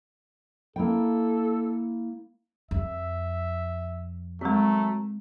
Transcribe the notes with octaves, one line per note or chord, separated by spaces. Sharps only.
A#3 E4 A4 G5
F2 E5
F#3 G#3 A3 C4 A#4